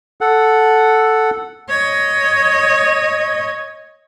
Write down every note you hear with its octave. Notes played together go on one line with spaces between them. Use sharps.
A4 F#5
C#5 D#5